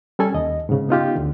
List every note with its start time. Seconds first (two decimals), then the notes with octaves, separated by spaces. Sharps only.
0.19 G3 C#4 A4 G#5
0.34 D#2 D#5
0.69 G#2 C#3
0.89 B3 D#4 F4 G4
1.16 D2 D3